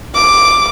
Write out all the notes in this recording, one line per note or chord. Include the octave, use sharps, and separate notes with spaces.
D6